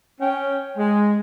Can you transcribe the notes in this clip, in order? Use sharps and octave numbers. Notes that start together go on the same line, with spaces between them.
C#4 G5
G#3